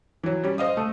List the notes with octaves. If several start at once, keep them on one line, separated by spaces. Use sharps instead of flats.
E3 F#3
G3 C#4
C5 D#5 F5 D#6
A3